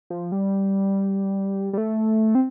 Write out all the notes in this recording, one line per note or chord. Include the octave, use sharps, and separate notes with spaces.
F3
G3
G3
A3
C4